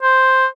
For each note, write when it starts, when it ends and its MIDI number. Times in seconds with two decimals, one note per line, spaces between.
0.03 0.46 72